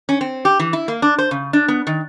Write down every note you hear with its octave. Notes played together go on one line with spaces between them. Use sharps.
C#4
C4
G4
E3
E4
A#3
D4
C5
C#3
D4
B3
D#3